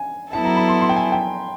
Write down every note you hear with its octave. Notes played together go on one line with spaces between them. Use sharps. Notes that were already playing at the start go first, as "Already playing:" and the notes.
Already playing: G#5
F#3 B3 E4 A4 A5
A#5
B5
C6
C6
G5
G#5
G5